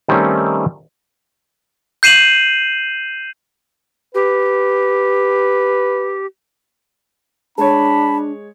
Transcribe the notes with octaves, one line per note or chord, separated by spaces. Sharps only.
D#3 G3 A3 C4 C#4 D#4
G6 C7 D#7 E7 F#7
G4 B4
G#3 D4 C#5 A5 B5